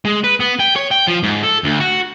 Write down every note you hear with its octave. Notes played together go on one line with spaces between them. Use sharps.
G#3
B4
B3
G5
C#5
G5
F3
G#2
A4
D2
F#4